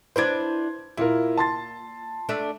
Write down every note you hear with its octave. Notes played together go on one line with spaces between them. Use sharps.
D4 E4 B4 C5 G#6
A#2 E4 F4 A#4
A5 C6 A6
A3 D4 E5